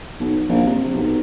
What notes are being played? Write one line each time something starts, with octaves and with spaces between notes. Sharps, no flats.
B1
A#1
C3
B1